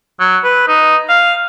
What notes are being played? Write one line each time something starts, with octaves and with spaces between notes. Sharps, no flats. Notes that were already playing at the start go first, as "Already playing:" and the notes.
F#3
B4
D#4
F5